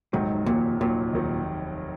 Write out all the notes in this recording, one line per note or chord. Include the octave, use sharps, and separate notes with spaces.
F1 D#2 G#2 D#3 F#3
F1 D#2 A#2 D#3 F#3
F1 D#2 A#2 D#3 F#3
F1 D#2 D#3 F#3